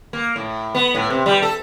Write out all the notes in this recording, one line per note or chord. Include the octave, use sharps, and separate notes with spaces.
A#3
A2
B3
A2
C3
G3
A4